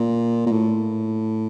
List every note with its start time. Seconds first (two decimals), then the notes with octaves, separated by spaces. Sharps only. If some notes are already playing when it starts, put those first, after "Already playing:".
Already playing: A#2
0.46 A#2
0.51 A2